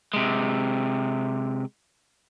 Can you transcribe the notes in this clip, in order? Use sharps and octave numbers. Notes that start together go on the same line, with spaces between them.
C3 G#3